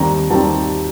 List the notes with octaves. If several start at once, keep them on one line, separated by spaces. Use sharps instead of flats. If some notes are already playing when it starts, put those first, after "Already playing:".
Already playing: D#2 D#3 G3 C4 A#5
D#2 D#3 G3 C4 A5